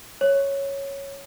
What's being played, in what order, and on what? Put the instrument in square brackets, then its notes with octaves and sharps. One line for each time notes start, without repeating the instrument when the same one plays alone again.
[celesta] C#5